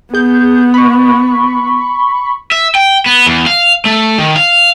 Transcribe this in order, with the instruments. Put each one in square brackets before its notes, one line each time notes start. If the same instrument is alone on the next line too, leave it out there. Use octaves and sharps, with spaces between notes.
[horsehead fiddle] B3 [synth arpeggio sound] G#4 G6
[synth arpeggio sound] B5 C#6
[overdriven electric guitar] E5
G5
B3
E2
F5
A3
D#3
F5